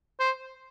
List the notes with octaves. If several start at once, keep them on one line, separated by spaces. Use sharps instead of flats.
C5